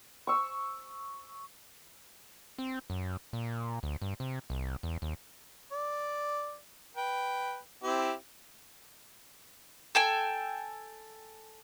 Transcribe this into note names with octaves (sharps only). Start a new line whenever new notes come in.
C#6 E6
C4
F#2
A#2
D2
G2
C3
C2
E2
D#2
D5
B4 G5
C4 E4 G4
A4 G5 G#5